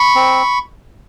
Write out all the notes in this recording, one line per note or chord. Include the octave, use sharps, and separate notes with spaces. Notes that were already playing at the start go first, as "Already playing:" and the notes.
Already playing: B5 C#6
C4